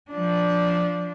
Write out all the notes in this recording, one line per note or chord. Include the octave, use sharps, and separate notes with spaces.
F3 D4